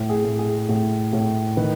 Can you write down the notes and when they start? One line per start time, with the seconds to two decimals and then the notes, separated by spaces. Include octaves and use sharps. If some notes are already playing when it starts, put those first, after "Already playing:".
Already playing: A2
0.10 G#4
0.24 A2
0.39 G#4
0.69 A2
1.13 A2
1.57 D#3 B4